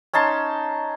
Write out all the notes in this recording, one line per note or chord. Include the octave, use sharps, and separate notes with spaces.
C#4 D#4 A5 C6